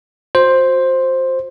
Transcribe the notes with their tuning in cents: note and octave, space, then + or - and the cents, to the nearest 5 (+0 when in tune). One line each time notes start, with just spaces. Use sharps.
F#4 -30 C5 +5